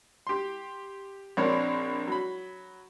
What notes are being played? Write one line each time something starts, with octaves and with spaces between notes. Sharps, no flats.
G4 C6
A#1 C4 D4 A#4 C#5
F#3 B5